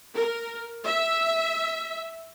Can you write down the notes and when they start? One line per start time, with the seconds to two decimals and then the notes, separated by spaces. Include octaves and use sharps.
0.15 A#4
0.86 E5